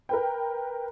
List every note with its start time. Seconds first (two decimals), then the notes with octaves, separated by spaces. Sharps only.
0.09 A#4 B4 G5